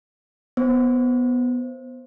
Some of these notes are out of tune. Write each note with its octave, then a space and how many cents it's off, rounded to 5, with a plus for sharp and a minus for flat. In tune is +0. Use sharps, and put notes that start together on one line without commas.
B3 +0 C5 +10